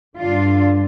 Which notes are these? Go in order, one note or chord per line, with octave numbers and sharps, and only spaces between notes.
G2 D3 G3 D4 F4